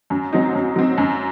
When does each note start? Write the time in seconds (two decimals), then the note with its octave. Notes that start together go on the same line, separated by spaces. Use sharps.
0.10 F#2
0.33 F#3 C4 D#4
0.55 F#2
0.76 F#3 C4 D#4
0.98 F#2